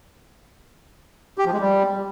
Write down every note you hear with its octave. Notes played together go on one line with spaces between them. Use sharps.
G4
F3
G#3
G3